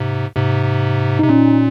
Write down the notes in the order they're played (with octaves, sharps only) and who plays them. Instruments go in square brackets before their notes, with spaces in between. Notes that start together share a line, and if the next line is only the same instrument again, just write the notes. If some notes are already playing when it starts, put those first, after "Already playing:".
Already playing: [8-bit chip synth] G#2 C3
G#2 C3
[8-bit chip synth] C3 [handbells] D#4
[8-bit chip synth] A#2 [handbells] C#4